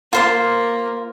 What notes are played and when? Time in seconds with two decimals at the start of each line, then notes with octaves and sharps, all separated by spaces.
0.13 A#3 F4 C5 C6